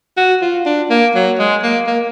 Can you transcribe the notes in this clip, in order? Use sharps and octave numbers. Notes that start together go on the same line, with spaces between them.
F#4
F4
D4
A#3
F#3
G#3
A#3
A#3